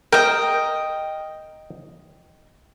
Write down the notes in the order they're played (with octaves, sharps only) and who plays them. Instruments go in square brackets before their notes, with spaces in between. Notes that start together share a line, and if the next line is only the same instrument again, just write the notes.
[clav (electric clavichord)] A#4 [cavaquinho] D#5 G5